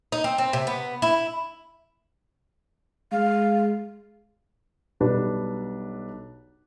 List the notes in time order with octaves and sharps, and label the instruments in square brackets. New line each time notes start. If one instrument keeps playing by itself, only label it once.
[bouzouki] D#4
C4
C4
C3
B3
E4
[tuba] G#3 [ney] F5
[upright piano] B1 G3 D4 B4